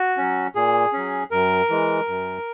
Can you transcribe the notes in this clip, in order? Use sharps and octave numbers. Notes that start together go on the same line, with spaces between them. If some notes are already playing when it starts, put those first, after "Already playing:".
Already playing: F#4
F#3 C#4
A#2 G#4
F#3 C#4
F#2 A#4
E3 G#3
F#2